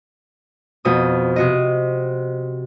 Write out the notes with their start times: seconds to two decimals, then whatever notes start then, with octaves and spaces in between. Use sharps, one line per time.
0.85 F2 B2 D#6
1.36 C3 F#4 D#5